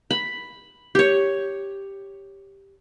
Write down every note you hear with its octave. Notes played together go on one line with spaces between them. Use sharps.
B5
G4 C#5